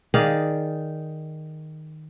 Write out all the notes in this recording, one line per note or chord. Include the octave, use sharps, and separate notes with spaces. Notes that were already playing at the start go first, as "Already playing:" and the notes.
D#3 G#4 D5 F5